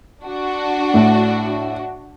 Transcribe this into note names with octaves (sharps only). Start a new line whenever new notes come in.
D4 F#4
A2